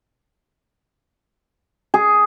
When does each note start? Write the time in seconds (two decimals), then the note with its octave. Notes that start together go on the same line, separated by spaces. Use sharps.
1.94 G#4